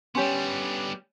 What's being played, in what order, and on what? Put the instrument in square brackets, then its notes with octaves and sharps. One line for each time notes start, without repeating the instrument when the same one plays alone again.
[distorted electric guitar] G3 B3 [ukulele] C#4 G4 [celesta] C#5 G#5 C6